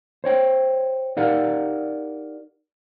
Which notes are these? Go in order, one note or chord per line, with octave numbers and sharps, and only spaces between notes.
C5 C#5 G5
D#4 G4 A#4 D5 F5 F#5